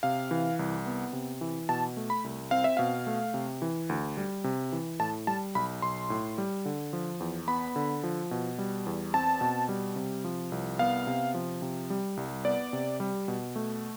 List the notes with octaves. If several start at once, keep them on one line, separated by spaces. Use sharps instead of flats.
C3 F5
E3
C2
B3
C3
E3
B2 A5
A3
B5
C2
C4 F5
E5
B2 F5
A3
C3
E3
D2
G3
C3
E3
A2 A5
G3 A5
B1 B5
B1 C6
A2
G3
D3
F3
E2
B3 B5
D3
F3
B2
G3
E2
C4 A5
B2
G3
C3
F3
C2
B3 F5
C3
F3
C3
G3
C2
B3 D5
C3
G3
B2
A3